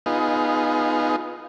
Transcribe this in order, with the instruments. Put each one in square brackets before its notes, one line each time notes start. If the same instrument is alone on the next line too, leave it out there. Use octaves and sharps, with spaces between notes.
[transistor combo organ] B3 D#4 F4 G#4